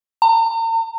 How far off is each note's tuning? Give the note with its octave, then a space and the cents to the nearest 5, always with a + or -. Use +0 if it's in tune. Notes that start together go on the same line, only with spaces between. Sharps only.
A#5 -40